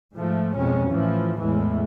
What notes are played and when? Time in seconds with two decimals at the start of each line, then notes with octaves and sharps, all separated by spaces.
0.14 G#2 F3 A3
0.56 F2 B2 G#3 C#4
0.89 A2 E3 F3
1.39 E2 A2 E3 G#3